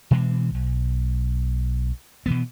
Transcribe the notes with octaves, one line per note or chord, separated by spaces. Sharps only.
B2 E3 G#3 C4
B1
B2 E3 B3